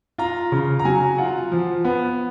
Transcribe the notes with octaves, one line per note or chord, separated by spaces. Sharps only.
F4 A#5
C#3
A#5
F#3 G#5
F4 F#5
F3
B3